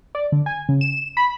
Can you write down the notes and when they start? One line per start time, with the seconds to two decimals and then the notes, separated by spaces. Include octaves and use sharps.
0.15 D5
0.32 D3
0.46 G#5
0.69 C#3
0.81 E7
1.17 B5